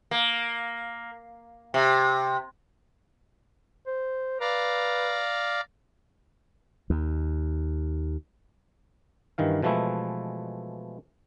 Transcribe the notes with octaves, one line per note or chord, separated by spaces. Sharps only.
A#3
C3
C5
B4 D5 F5 A#5
D#2
G2 D#3 E3 F5
B2 E3 F3 G#3 A3 E4